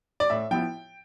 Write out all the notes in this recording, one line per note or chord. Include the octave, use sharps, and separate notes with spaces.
D5
A2 E5
F3 B3 E4 G5